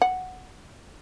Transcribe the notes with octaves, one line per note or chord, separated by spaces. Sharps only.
F#5